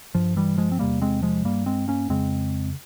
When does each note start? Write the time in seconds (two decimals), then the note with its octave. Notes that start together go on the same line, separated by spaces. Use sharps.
0.15 G2 F3
0.37 E3 G3
0.58 F3 G#3
0.72 C4
0.79 E2 C3 G3 A#3
1.02 G#3 C4
1.22 F3 G#3
1.44 G2 G3 A#3
1.66 G#3 C4
1.88 A#3 C#4
2.09 F2 C#3 G#3 C4